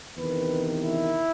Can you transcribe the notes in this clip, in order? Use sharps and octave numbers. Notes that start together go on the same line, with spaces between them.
E2 C3 D#3 B4
E4